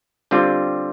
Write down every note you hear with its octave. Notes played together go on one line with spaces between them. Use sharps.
D3 G3 C4 F4